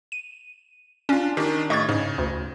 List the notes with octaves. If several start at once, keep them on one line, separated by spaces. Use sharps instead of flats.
D#7
C#4 D4 F4
D#3 D4 G4
A2 D#5 C#6 G#6 A6
G#2 C#3
D2